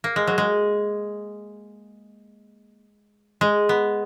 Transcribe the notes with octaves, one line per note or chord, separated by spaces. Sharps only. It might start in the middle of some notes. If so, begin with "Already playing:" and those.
A#3
G#3
F#3
G#3
G#3
B3